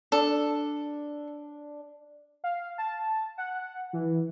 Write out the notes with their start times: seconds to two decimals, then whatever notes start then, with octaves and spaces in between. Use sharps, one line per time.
0.12 D4 A4
2.44 F5
2.78 A5
3.38 F#5
3.93 E3